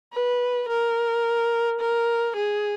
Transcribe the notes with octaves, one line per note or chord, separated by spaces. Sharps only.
B4
A#4
A#4
G#4